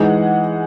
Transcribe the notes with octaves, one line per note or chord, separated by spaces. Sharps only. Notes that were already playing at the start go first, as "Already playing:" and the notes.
Already playing: E3 G#3 D#4 F#5